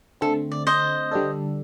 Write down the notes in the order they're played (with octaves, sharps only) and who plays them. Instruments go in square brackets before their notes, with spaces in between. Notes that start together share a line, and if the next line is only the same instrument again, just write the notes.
[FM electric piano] D3 A3 C4 [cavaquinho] A4
[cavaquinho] D5
C5 D#5
[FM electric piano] D3 G3 D4 A4